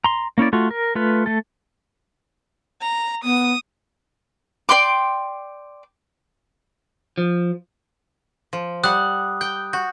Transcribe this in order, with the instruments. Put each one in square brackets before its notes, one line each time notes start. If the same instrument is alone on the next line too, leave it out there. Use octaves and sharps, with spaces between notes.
[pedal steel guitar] A#5 C6
A#3 C#4 E4 D5
A3 F4 F#4
A#4
A3 F4 B4
A3 A4
[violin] A#5
[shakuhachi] B3 [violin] D#6
[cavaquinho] D5 G5 C6 D6
[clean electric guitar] F3
[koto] F3
[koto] G3 F#5 [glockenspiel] D#6 F#6
[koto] G5 [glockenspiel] G6
[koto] F#4 [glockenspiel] G6